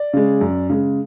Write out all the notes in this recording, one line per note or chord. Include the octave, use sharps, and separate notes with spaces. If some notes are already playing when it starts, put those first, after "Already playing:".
Already playing: D5
C#3 G#3
F#2
C#3 G#3